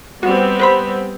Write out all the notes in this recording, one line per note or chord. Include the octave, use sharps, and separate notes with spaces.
G3 B3 C4 F#4
B4 C5 B5